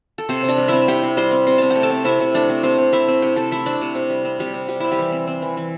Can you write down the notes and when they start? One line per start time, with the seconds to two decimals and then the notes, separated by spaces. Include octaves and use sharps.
0.18 A4
0.29 C3 C4 C5
0.43 C3
0.48 D4 D5
0.58 G3
0.68 C4 E4 E5
0.88 C3 G4 G5
1.03 C3
1.17 G3 C5 C6
1.31 C4
1.47 C3 C6
1.58 C3 A5
1.71 A3 G5
1.83 A4 A5
1.91 C4
2.05 C3 E4 E5
2.20 C3
2.34 A3 D4 D5
2.50 C4
2.63 C3 C4 C5
2.78 C3
2.92 A3 E4 E5
3.08 C4
3.22 C3 G4 G5
3.36 C3 A4 A5
3.52 A3 E4 E5
3.66 C4 D4 D5
3.81 C3
3.95 C3
4.10 G3
4.25 C4
4.39 C3 G3 G4
4.54 C3
4.69 G3 G4
4.80 C4 E4
4.91 G3 G4
4.99 E3
5.12 C4
5.27 C4
5.42 E3
5.57 E3